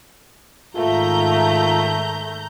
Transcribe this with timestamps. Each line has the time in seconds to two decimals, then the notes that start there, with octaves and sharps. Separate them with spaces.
0.76 G#2 D#3 A3 F4 E5 A#5 G6